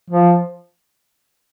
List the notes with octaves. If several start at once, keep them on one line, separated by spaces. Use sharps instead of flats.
F3